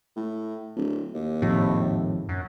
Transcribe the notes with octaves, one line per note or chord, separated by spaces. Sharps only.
A2
D1
D#2
G#1 F2 A2 C3
F#2